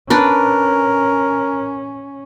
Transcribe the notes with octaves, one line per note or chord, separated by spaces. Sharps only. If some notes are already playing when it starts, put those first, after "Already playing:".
C#4 D4 A#4 B4